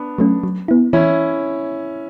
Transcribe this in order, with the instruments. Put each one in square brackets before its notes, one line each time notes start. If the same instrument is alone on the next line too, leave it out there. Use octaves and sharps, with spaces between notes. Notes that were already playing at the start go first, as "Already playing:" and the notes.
Already playing: [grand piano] B3 D4
[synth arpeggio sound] F#3 A3 C#4
F#3
B3 E4
[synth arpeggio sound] E3 [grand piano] C#4 E4